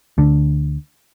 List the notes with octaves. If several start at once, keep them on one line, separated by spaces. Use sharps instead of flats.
D2 D3